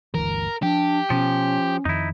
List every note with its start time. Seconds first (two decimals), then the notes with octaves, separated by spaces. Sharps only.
0.14 G1 D2 E3 A#4
0.63 F3 D4 G4
1.10 B2 F3 C#4
1.85 F2 D#3 D#4 E4